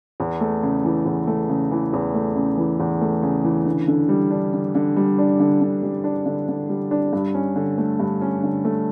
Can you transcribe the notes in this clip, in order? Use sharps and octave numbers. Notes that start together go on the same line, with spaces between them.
E2
A3
C#3
E3
E2
A3
C#3
E3
E2
A3
C#3
E3
E2
A3
C#3
E3
D3
D3
G3
D4
D3
D3
G3
D4
D3
D3
G3
D4
D3
D3
G3
D4
G2
C#4
D3
A3
G2
C#4
D3
A3